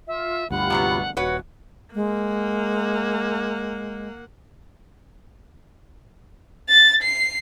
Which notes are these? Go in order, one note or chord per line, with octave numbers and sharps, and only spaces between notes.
F4 E5
D2 G2 F4 G4 F#5 B5
C3 F#3 B3
D#1 F#4 B4 C#5 F#5
G#3 A#3 F#5
A6
C7